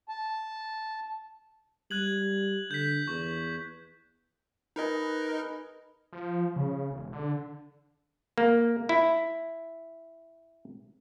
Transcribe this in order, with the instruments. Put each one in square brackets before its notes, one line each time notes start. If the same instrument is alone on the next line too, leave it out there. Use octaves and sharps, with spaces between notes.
[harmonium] A5
[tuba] G3 [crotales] F#6 G#6 F#7
[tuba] D3 [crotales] G6 B6
[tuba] E2 [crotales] C#6
[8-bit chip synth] D#4 A#4 D#5 [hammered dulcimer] G#4 B4
[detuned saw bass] F3
C#3
E1
D3
[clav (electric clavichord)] A#3
E4